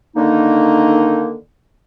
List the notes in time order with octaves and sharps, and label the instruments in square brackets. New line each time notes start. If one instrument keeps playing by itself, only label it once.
[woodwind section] D3 D#3 A#3 D#4